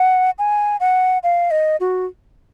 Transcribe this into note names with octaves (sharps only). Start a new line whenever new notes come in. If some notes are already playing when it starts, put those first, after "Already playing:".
Already playing: F#5
G#5
F#5
F5
D#5
F#4